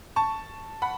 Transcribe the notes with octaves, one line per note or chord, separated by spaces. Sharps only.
A5 C#6
F#5 B5